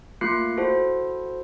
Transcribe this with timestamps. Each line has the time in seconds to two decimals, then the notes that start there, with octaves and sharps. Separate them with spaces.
0.21 A3 A#3 F4 F#6 C7 C#7
0.57 E4 F#4 A4 C5